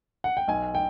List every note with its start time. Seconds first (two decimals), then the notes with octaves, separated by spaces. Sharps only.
0.24 F#5
0.37 G5
0.48 B1 G#5
0.75 G5